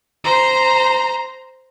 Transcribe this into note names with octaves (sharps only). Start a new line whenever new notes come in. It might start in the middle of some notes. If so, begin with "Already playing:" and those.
C5 A#5